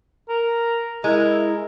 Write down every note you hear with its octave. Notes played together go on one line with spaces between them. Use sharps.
A#4
G#3 E4 A#4